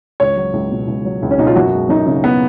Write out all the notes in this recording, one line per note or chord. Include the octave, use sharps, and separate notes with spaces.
C#2 C#5
F#3
C#2
B2
C#2
F#3
C#2
C#4
B2 D#4
F4
F#2 F#4
G#3
F#2 D#4
C#3
B3